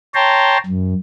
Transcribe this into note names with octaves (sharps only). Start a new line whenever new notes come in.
C#5 G5 A5 A#5 C6
F#2